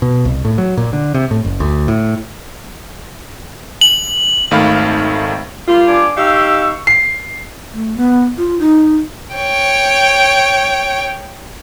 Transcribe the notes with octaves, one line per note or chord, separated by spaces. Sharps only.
B2
C2
A2
F#3
A#2
D3
C3
A2
F#1
D2
A2
F#7
G#1 D#3 A3 F5 B5 F6
G3 A#3 F4
D4 G#5 D6
D#4 G4 F5 C#6 E6
C7
A3
B3
F4
D#4
C#5 G5